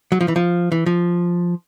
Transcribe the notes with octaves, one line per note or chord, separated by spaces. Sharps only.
F#3
F3
E3
F3
E3
F3